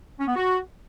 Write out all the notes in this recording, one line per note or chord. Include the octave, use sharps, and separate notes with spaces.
C#4
B3
F#4